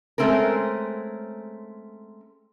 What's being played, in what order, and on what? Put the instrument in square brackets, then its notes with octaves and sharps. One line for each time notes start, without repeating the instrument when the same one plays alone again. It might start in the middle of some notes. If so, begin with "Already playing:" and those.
[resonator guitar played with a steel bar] G#3 A3 C4 C#4 A#4